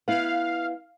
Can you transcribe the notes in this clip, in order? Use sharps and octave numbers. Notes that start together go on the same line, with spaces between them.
B3 E4 F5